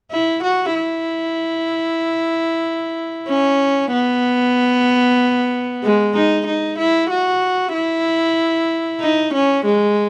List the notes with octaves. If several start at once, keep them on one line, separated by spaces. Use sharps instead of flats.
E4
F#4
E4
C#4
B3
G#3
D#4
D#4
E4
F#4
E4
D#4
C#4
G#3